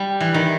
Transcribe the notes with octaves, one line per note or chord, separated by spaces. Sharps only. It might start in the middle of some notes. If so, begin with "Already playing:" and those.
Already playing: G3
E3
D#3